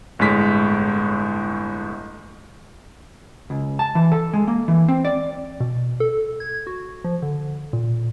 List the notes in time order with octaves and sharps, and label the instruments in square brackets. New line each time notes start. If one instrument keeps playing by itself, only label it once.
[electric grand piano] G1 A2 G#3 B6
[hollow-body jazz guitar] C#2
A5
E3
A4
G#3
A#3
E3
C4
D5
[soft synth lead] B2
A4
G#6
F#4
F3
D3
A#2